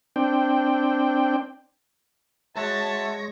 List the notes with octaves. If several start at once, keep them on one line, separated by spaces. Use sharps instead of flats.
C4 D4 G5
G#3 F#4 C#5 E5 A5 A#6